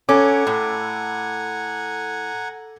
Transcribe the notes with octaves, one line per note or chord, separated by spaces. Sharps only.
C#4 A4 F#5 G#5 A#5 D6
A2